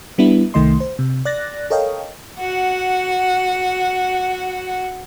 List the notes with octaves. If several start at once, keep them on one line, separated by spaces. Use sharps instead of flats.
G3 B3 D4 E4
C2 D#3 A3 D#5 C6
C5
C3
D5 F#6 A6 A#6
A4 A#4 C#5 D#5 F5 G5
F#4 F#5